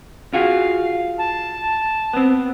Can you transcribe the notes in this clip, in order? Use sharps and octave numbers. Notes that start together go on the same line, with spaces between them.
F4 F#4 G#4 F5
A5
B3 C4